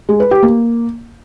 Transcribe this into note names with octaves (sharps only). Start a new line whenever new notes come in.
G#3
B4
G4
A#3